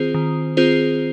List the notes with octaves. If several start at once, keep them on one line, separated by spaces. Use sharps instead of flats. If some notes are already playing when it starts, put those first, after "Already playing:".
Already playing: D#3 C4 F4 G#4 C5
D#3
C4 F4 G#4 C5